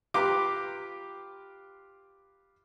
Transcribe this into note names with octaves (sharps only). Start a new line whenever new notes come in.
F4 G4 B4 A#5 C6 D6